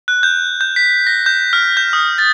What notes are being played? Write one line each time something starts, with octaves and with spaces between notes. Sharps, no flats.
F#6
G6
G6
B6
A#6
G6
F6
G6
D#6
A6